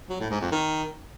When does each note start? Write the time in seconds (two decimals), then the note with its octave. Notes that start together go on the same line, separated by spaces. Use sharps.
0.09 F#3
0.20 A2
0.30 G#2
0.41 F2
0.51 D#3